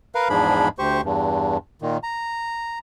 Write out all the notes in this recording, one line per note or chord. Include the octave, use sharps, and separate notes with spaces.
A#4 B4 F5
E2 G#2 F3 D4 G#4 B5
D2 G4 C5 C#6
E2 G2
A#2 D#3
A#5